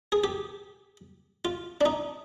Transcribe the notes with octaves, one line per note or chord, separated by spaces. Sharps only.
G#4
G4
F4
D4
D#4